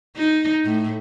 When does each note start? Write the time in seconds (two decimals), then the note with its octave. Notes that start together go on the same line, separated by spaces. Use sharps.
0.16 D#4
0.65 A2